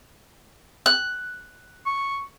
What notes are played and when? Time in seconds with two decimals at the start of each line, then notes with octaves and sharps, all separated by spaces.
0.86 F#6
1.86 C#6